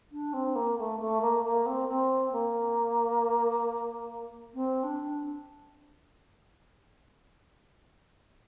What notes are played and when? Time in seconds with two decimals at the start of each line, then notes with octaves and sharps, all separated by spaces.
0.12 D4
0.33 C4
0.55 A#3
0.78 A3
1.00 A3
1.21 A#3
1.44 A#3
1.66 C4
1.88 C4
2.32 A#3
4.54 C4
4.83 D4